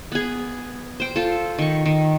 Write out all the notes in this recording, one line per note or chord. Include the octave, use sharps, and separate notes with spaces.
B3 G#4
C5 G5
F4 A4
D#3 C#6
D#3